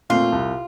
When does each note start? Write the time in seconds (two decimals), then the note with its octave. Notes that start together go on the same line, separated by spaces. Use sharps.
0.10 A#2 A3 C4 F4
0.32 C2